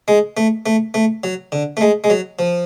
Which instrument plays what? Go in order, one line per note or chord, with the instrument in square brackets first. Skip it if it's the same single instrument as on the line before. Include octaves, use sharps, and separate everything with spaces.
[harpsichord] G#3
A3
A3
A3
F#3
D3
A3
G#3
G#3
F#3
F3